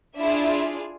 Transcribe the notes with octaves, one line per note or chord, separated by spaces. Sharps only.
D4 E4 F4 G#4 E5